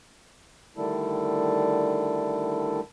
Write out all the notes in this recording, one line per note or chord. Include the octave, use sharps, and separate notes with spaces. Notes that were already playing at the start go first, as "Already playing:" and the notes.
D3 D#3 G3 A3 D4 E4